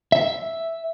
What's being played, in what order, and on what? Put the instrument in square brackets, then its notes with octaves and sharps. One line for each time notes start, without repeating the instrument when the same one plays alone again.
[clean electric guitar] E5